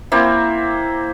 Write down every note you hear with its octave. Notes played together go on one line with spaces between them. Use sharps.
A#3 C4 E4